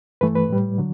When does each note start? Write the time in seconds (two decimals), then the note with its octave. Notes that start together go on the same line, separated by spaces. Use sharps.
0.21 G2 E3 A3 B4
0.35 B4
0.50 A2 G3
0.78 D3 F#3